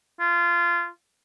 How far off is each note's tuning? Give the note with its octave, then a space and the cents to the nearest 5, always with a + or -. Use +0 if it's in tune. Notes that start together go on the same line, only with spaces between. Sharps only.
F4 -20